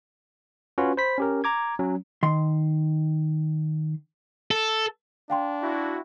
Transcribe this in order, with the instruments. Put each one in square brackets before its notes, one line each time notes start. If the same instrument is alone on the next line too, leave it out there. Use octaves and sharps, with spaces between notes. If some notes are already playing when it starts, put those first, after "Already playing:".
[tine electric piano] C#4 F4 F#4 B4
C5 B5 B6
C#4 G4 A#4
A#5 D6 G#6
F#3 C#4
[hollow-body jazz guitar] D#3 C6
[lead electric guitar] A4
[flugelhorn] D4 [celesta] F5 G5 C6
[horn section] E4 F#4